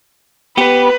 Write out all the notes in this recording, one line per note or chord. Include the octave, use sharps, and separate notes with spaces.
B3 G4 B4